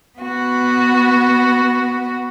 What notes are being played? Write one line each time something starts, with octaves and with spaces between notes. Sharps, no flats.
B3 F#4